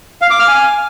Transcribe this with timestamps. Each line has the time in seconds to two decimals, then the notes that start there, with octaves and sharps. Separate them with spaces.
0.22 F5
0.30 D6
0.39 F6
0.48 G#5